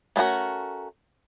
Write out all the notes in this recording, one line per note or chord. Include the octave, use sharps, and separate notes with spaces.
A3 B3 C#4 F#4 A#4